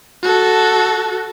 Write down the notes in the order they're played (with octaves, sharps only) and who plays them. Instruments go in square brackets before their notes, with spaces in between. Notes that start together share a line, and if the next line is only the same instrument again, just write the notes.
[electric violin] F#4 A4